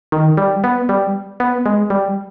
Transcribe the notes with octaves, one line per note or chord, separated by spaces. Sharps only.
D#3
G3
B3
G3
B3
G#3
G3